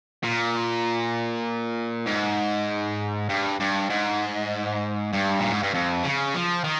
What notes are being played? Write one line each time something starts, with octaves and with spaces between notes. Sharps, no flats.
A#2
G#2
G2
G2
G#2
G2
A#2
G#2
G2
F2
C#3
F3
D#3